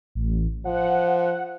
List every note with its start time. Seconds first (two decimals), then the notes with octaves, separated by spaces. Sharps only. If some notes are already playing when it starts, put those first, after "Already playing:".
0.15 A1
0.65 F3 F#5